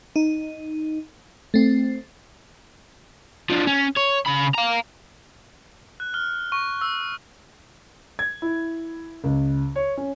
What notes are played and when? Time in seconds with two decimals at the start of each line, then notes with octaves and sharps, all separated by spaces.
0.16 D#4
1.54 A3 C4
3.50 D3 F3
3.67 C#4
3.96 C#5
4.26 C#3 B5
4.54 F5 A#5
6.00 F#6
6.14 F6
6.52 C#6
6.81 E6
8.19 G#6
8.42 E4
9.24 C#2
9.76 C#5
9.97 C#4